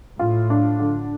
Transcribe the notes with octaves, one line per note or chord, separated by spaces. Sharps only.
A2 F4
D4
D3